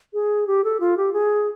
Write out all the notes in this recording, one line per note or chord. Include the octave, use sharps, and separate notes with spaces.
G#4
G4
A4
F4
G4
G#4